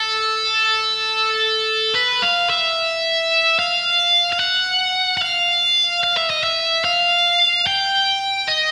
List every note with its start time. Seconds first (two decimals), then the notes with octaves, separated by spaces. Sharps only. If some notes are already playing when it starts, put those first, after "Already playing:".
Already playing: A4
1.95 B4
2.23 F5
2.50 E5
3.59 F5
4.33 F5
4.40 F#5
5.17 F#5
5.22 F5
6.03 F5
6.17 E5
6.30 D#5
6.43 E5
6.85 F5
7.67 G5
8.48 D#5